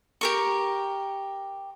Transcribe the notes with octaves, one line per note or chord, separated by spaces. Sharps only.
G4 A#4 C#6